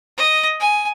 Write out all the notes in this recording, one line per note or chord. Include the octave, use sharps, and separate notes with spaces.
D#5
G#5